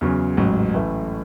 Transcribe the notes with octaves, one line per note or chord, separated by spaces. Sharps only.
E2 C#3 F#3
A1 G#2 F#3
A1 A2 E3 A3